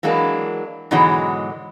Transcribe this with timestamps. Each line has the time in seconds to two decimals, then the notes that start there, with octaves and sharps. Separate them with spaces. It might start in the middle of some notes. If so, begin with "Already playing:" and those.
0.03 E3 F#3 G#3 A#3 D4
0.91 G#2 B2 D3 E3 F#3 G#3